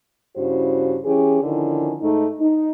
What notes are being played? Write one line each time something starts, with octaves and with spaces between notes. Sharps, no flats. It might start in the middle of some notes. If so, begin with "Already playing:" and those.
G2 C#3 E4 F#4 C5
E3 C#4 G4 G#4
D3 D#3 F3 C#4 E4
G#2 A3 D#4
D#4